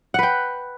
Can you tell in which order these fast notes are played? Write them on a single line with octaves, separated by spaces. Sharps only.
F#5 B4 G5